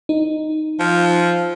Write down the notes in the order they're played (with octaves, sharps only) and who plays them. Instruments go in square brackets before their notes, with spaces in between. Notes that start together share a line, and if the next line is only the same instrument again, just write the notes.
[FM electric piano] D#4
[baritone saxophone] F3